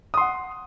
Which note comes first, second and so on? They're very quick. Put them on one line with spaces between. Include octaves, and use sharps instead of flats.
D#6 C6 F#5